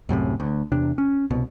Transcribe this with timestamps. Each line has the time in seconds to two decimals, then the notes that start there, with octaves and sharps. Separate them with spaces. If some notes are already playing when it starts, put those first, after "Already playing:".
0.09 C2 F#2 A2 C3
0.40 D2
0.72 E2 C3 D4
0.98 C#4
1.31 C2 B2